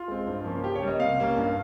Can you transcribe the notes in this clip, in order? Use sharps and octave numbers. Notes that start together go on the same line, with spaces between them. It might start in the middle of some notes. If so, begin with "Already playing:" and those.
Already playing: F4
G#3 C4
G2
F3 A#3 C#4
C#3 G4
C#5
G3 A#3
D#5
C3 F5
G3 A#3 C#4
G2